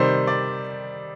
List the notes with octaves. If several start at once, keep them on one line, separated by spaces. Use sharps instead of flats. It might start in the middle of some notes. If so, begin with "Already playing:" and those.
Already playing: C3 D#3 G3 C5
D5